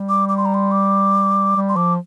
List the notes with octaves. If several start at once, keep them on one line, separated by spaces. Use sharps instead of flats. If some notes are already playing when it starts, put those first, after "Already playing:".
Already playing: G3
D6
D6
C6
A#5
C6
D6
G3
C6
F3 D6